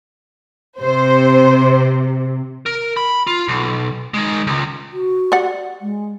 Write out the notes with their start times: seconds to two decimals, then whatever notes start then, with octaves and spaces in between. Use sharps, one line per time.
0.80 C3 C5
2.66 A#4
2.97 B5
3.27 F4
3.48 B1
4.14 D#3 G#3
4.47 C#2
4.93 F#4
5.32 G4 D5 F#5
5.82 G#3